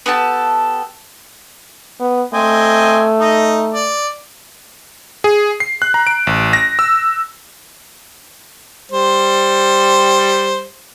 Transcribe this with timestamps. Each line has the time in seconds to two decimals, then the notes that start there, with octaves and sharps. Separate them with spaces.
0.06 B3 G4 A4 A5
2.00 B3
2.34 A3 C4 D#5 G#5
3.20 D#4 D#5
3.73 D5
5.24 G#4
5.60 C7
5.82 F#6
5.94 A#5
6.07 D7
6.27 A1
6.53 A#6
6.79 E6
8.92 G3 C5